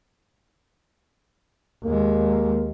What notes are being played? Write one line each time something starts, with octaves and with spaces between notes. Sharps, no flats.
D#2 G#3 A#3